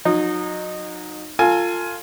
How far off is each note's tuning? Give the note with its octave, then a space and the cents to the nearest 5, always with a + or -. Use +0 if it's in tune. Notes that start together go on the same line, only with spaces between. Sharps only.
F#3 -35 D#4 -15
F4 +0 A4 +35 G#5 +15